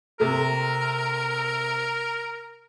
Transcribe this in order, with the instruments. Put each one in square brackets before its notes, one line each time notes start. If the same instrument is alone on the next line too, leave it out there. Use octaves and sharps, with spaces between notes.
[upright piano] C3 A3 [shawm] A#4